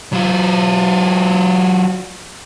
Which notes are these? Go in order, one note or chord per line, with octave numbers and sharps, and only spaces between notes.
F#3 F4